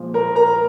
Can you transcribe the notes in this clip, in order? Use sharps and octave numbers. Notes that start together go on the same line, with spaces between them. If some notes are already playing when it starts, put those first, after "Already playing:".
Already playing: A#2 F3 G#3
A#4 A#5
A#4 A#5